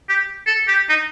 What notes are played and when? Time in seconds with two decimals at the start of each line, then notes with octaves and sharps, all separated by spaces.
0.09 G4
0.47 A4
0.68 G4
0.89 D#4